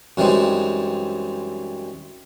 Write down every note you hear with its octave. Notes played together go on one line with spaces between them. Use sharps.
F#2 E3 G3 G#3 C4 D#4